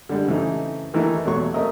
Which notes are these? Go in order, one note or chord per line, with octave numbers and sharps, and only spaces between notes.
D3 G3 G#3
C#3 E3 A3 C4 D#4
D#3 E3 A3 D#4 E4 A#4
E2 B2 F#3 A3 C#6
A3 C4 A#4 D#5 E5